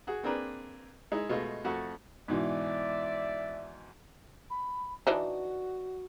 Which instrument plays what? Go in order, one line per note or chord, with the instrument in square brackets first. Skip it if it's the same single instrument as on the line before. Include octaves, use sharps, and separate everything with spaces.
[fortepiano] F#4 G#4
A#3 C4 D4 G#4 A#4 B4
G#3 D#4 E4
B2 G#3 A3 F4
F2 A3 F#4
[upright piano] G#2 B2 E3 [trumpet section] D5 E5
[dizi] B5
[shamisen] E3 D4 D#4 [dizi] F#4